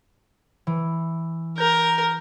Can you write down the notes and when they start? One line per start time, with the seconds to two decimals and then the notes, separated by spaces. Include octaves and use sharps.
0.67 E3
1.58 A#4 G6